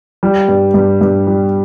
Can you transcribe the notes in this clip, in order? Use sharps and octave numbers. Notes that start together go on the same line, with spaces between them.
G3
G2
G2
G2
G3